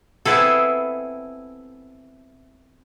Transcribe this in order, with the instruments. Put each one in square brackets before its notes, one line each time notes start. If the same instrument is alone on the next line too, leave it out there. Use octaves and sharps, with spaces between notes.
[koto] B3 C4 E4 G#4 A4